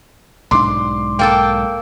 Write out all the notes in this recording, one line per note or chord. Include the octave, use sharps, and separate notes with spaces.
B1 G#2 D4 C6 D6
A#3 A4 G5 A5